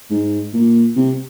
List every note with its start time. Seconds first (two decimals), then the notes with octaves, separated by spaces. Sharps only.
0.10 G#2
0.53 A#2
0.96 C3